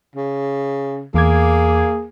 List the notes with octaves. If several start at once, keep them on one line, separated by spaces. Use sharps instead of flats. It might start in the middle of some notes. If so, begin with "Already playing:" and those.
C#3
E2 A#3 G#4 D6 G#6